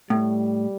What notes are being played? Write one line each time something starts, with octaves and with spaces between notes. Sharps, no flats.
A2 G3